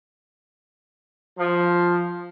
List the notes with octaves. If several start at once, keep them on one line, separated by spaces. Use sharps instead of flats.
F3